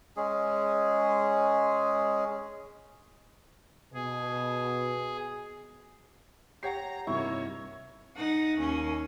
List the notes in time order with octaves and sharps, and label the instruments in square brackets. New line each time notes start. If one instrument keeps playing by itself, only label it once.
[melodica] G#3 C#4 G#4
[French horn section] B2 [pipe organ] G#4
[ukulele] G4 C#5 F#5 [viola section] A#5 [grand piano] C7
[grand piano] G2 C3 D#4 [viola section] A#3 C#5 [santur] E4 [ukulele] F#4
[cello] D#4 F#5
D#2 C#4